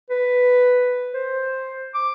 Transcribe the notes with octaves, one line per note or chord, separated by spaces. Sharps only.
B4
C5
D6